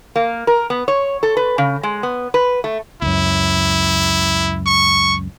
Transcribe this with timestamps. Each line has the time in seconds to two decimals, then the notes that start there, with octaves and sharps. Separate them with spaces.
0.16 A#3
0.47 A#4
0.70 B3
0.88 C#5
1.23 A4
1.37 B4
1.58 C#3
1.83 G#3
2.03 B3
2.34 B4
2.64 A3
3.02 C#2 F#2 E4
4.66 C#6